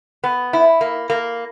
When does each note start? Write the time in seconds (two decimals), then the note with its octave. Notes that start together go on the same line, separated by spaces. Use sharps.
0.24 B3
0.53 E4
0.81 A#3
1.10 A#3